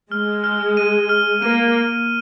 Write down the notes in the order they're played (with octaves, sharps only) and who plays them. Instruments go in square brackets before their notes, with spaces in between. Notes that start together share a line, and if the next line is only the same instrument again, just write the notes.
[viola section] G#3 [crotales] F6
[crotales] F6
D#7
F6
[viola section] A#3 [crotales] D#7